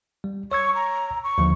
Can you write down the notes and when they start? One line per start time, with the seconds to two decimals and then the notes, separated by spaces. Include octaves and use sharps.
0.24 G3
0.52 C#5 C#6 E6 G#6
0.75 A#5
1.24 C#6
1.38 D#2 D3 F3